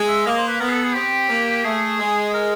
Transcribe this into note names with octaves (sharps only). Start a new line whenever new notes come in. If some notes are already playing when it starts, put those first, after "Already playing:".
Already playing: G#3
E5
A#3 D#5
C5
B4
B3 A#4
G#4
A4
G#4
C4 G4
A#3
A3 G#4
G#3
A#4